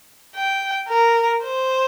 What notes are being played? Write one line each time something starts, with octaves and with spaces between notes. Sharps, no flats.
G5
A#4
C5